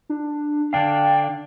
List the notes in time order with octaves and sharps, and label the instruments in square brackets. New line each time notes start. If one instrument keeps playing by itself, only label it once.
[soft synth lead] D4
[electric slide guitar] D3 D4 F5 [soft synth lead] G5